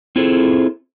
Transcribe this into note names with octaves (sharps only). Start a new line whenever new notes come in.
C4 E4 F4 G#4 A4 C5